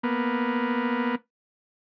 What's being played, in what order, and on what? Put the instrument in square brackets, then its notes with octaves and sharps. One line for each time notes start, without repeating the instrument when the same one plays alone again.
[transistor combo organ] A#3 B3